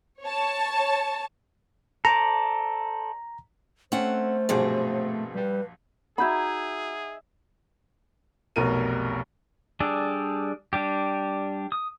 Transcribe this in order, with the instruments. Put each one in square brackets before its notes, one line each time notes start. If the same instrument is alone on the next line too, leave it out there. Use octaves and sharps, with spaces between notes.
[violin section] C#5 A5
[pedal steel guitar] A4 C5 D5 [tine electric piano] A#5
[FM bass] A3 [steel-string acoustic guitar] C4 F#5 [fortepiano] C#4 [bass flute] C5
[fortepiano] A#1 G2 F#3 [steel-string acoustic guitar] B2 C4 G#4
[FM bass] G3 [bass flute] B4
[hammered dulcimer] D#4 E5 [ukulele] F#4 B5 [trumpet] G#4 [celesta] F#5 G6 G#6
[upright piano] F1 B1 B2 A#4 D#7
[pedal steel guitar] G3 D4 G#4 A4 D5
G3 D4 G4
D#6